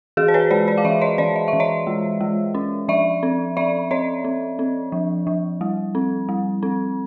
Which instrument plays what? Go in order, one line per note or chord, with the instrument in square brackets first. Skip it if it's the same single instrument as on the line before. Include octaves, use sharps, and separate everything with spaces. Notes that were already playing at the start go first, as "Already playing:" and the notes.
[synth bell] E3 F#4 G#4
C5
B4 C#5
G#3 C5 D5
C5 D5
F5
E3 D5 E5
C#5 D#5
E3 C5 D5
D#5
E5
E3
C#5 D#5
G#3
G#3
C#4
F3 D5 E5
C4
C4 D5 E5
C4 C#5 D#5
C4
C4
F3
F3
G3
C4
G3
C4